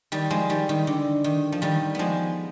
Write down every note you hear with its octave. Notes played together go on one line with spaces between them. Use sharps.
D#3 G3
F3 G#3
D#3 G3
D#3
D3
D#3
F3
D#3 G3
F3 G#3 B3